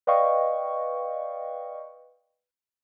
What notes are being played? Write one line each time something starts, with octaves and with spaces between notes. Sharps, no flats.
B4 D5 D#5 F5 G5 C#6